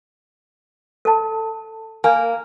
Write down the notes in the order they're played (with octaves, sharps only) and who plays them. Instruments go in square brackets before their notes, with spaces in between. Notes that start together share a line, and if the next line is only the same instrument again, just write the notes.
[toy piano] A4 A5
[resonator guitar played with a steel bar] A#3 [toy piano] G#5